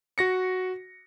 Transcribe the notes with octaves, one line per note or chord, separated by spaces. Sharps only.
F#4 A#6 C#7